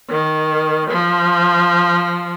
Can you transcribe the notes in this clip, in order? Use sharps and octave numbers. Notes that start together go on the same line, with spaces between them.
D#3
F3